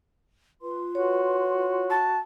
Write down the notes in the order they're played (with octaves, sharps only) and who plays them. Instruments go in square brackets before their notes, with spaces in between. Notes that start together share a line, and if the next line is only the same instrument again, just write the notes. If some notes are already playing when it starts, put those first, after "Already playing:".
[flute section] F4 B4 C6
[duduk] F#4 [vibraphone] C#5
[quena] A5